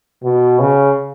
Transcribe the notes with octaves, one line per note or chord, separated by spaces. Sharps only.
B2
C#3